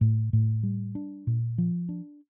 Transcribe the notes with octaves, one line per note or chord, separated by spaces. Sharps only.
A2
A2
G3
D4
A#2
F3
D4